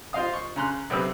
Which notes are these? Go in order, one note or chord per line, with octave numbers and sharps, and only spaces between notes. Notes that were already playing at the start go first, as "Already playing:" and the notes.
F4 C5 D#5 F5 D#6
C#6
C#3 A#5 C6 F#6
B1 C3 C4 B4 E6